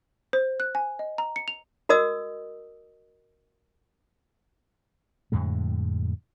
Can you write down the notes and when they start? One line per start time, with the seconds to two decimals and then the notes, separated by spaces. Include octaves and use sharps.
0.33 C5
0.60 F#6
0.75 G#5
0.99 D#5
1.18 A#5
1.36 C#7
1.48 F7
1.89 F#4 A#4 D#5 D#6 E6
5.32 F2 A2 D3 G#3